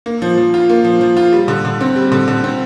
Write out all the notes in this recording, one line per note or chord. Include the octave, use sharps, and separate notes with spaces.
A#3
F3
F3
F4
A#3
F3
F3
F4
G3
D3
D3
C4
G3
D3
D3
C4